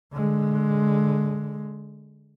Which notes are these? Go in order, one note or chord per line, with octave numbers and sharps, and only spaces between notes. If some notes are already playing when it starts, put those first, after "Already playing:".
D3 G#3